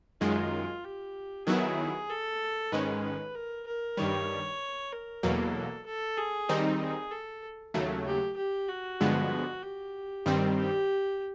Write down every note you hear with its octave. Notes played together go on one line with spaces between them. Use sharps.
F#2 D#3 G#3 F4
G4
D#3 F#3 B3 E4 G#4
A4
G#2 D#3 G#3 C#4 B4
B4
A#4
A#4
G2 D#3 G3 C#5
A#4
E2 B2 F#3 A#3 A4
A4
G#4
D#3 G3 C4 D#4
G#4
A4
D#2 C#3 F#3 A3
G4
G4
F#4
G2 D3 F3 G#3 B3
G4
G2 D#3 G3 C4
G4